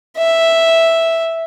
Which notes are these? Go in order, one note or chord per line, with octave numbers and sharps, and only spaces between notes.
E5